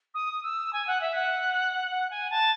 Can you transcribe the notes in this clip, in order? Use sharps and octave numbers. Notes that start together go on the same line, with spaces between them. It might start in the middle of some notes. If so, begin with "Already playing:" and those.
D#6
E6
G#5
F#5
E5
F#5
F#5
G#5
A5